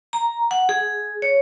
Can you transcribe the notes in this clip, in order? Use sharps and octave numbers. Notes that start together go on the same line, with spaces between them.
A#5
F#5
G#4
C#5